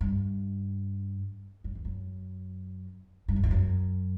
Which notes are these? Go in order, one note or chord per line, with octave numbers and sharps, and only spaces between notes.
G2
F#2
E2
F#2
G2
F#2
E2
F#2